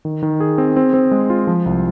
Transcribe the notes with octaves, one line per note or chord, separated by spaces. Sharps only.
D#3
D#3
G#4
C4
C4
C4
G#3
F4
F3
C2